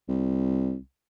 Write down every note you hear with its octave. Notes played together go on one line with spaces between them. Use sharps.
C2